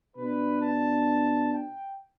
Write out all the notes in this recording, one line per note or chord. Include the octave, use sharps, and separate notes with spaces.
B2 B3 D4 B4
A5
G5